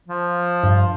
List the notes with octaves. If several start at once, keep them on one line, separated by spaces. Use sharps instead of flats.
F3
G2